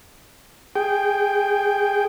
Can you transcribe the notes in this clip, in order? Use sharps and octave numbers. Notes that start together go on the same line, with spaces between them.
G#4 G5